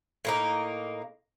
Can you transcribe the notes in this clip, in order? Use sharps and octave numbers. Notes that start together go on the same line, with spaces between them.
A2 A#3 D#4